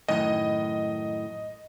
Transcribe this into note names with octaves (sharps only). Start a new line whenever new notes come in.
F#2 A2 D#3 D#5